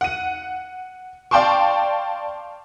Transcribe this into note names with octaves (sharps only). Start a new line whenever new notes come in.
F#5 D#7
D5 F5 G5 A5 C6 C#6